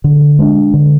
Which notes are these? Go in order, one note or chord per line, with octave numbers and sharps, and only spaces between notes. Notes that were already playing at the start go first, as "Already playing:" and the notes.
D3
G#3 D4
D3